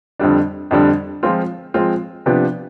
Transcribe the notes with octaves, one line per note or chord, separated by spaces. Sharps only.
F2 D3 G3 D4
F2 D3 G3 D4
F3 G#3 C4 F4
F3 G#3 C4 F4
C3 F3 B3 D4 G4